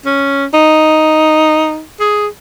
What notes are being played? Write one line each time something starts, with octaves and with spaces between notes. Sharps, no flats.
C#4
D#4
G#4